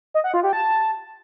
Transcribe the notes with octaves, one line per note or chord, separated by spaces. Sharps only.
D#5
F#5
F4
G4
A5